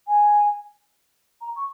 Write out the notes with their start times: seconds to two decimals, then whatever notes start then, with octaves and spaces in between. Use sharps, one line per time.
0.07 G#5
1.41 A#5
1.56 C#6